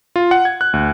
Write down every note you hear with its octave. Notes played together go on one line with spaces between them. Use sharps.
F4
F#5
G#6
F#6
D2